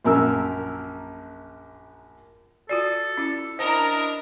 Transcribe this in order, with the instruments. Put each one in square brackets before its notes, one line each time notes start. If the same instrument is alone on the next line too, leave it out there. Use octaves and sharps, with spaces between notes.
[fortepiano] A#1 F#2 A#4 E6
[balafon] F4 F#4 D5 [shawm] A4
[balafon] C#4 E4
[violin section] D4 E4 A#4 [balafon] C5 [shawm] D#5